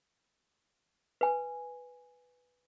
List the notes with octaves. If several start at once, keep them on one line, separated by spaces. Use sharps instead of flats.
B4 G#5